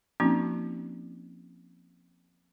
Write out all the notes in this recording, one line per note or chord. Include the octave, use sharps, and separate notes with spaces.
F3 A#3 C4 C#4 D#4 F#4